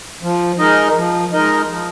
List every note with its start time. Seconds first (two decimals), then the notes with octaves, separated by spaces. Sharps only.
0.23 F3
0.59 G#3 D#4 A#4 D#5
0.96 F3
1.33 G#3 D#4 A#4 D#5
1.69 F3